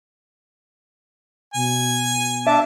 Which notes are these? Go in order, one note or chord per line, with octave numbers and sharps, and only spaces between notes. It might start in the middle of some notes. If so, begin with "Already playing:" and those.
B2 G#5
D4 E5 A5 D6